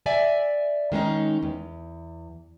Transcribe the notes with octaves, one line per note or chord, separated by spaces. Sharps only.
D5 E5 G#5
D#3 G#3 C#4 D#4
E2